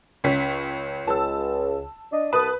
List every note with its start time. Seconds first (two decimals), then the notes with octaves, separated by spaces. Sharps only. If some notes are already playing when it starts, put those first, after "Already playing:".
0.24 C#2 C#4 B6
1.07 C#2 A5 E6
2.11 D4 D#5
2.33 C2 B4 A5 D#6